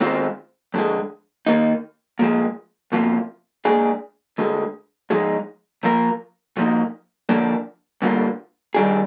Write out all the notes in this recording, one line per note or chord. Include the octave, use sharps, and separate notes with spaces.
D#3 G#3 C4 F4 C5
F2 D3 G#3
D#2 D#3 A#3 D#4
A#2 F3 G#3
D2 C3 F3 A#3 F4
A#2 G#3 D4 G#4
D2 D3 G#3
G#2 F3 G#3 D#4 G#4
A#2 F3 A#3 F4 A#4
A#2 F3 A#3 D#4
D3 F3 A#3 D4
G2 D3 G3 A#3 F4
G2 D#3 G3 D4 G#4